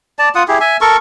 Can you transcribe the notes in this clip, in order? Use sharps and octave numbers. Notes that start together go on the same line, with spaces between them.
D5 A5
F4 F#5 D#6
E4 G4 G#4
E5 G#5
A4 A#4 C#6